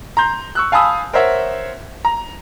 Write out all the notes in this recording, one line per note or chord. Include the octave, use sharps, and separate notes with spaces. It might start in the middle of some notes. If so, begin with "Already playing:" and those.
A#5 C6 G6
C#6 E6 F#6
F5 G#5 A5 B5 D#6 E6
A#4 C5 C#5 E5 F#5
A#5